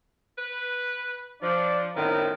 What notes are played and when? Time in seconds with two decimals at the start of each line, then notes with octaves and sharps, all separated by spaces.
0.38 B4
1.42 F3 D4 D5
1.95 F#2 A2 D#3 B3 C4 A#4